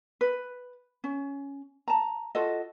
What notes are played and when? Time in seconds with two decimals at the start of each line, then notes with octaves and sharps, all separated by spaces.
0.21 B4
1.04 C#4
1.88 A5 A#5
2.35 F4 F#4 A4 D#5